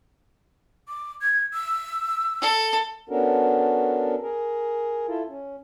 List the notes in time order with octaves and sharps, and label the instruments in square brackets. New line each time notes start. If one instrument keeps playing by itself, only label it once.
[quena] D6
G#6
E6
[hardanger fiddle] A4
[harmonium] B3 C#4 D4 F#4 A4 A#4
G#4 A#4
E4 F4 A4
C#4